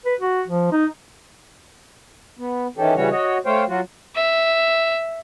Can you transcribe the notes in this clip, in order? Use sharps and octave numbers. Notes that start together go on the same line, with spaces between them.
B4
F#4
F3
D#4
B3
D#3 E3 C#4 G4 A4
C#3 E3 G3 C#4 F#4 C#5
F#4 C#5 D#5
A3 C5 C#5 F5 G5
F#3 F4 F#4
E5